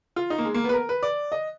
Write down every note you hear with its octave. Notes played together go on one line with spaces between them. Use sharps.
F4
D#4
A#3
G#3
A#3
B3 B4
A#4
B4
D5
D#5